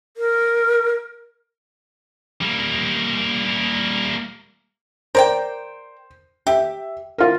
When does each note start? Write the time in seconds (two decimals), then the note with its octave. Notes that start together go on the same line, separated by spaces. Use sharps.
0.17 A#4
2.41 G3 A#3
5.15 A#4 C5 D5 G5
6.47 G4 E5
7.18 F4 A#4